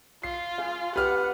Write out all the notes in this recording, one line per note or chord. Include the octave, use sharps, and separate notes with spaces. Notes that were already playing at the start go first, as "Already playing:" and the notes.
F4 C7
G#4 F5
G4 B4 F#5 F6